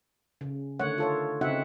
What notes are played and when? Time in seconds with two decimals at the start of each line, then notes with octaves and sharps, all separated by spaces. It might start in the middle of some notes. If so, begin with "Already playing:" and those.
0.41 C#3
0.80 D3 D#3 A3 C#5 F#5
0.98 F4 A4 C#5
1.41 C#3 C4 D#4 F#4 E5 F#5